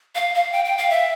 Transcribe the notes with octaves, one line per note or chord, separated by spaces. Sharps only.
F5
F5
G5
G5
F5
E5